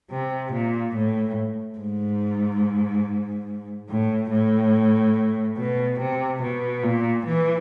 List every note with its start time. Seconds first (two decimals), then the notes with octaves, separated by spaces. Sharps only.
0.11 C3
0.52 A#2
0.95 A2
1.79 G#2
3.89 A2
4.31 A2
5.57 B2
5.99 C3
6.42 B2
6.83 A#2
7.26 E3